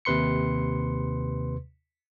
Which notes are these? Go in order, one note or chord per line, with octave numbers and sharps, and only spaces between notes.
D#2 C3 B4 C6 C#7